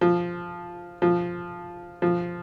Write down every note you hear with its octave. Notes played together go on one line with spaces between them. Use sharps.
F3
F3
F3